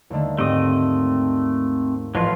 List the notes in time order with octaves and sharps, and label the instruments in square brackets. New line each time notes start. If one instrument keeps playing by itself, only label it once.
[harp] D#2 D3 A3
[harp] G#2 G4 [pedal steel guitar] A3 C4 D#6
[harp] A1 F3 [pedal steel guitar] F#3 A3 F4